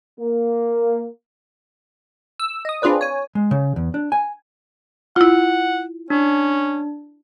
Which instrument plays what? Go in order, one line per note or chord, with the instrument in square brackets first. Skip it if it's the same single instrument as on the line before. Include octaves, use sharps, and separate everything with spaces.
[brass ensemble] A#3
[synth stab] E6
D#5 D#6
C4 D4 F4 G#4 B4 D5
C#5 G#5
[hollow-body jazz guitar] G#3
C#3
E2
D4
G#5
[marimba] E4 F4 [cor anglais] F#5
[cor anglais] C#4 [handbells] D4